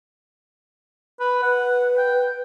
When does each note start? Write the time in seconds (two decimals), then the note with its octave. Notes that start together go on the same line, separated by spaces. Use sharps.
1.20 B4
1.43 B4 F#5
1.98 G5